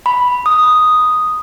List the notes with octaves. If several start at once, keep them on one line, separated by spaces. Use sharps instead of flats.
B5
D#6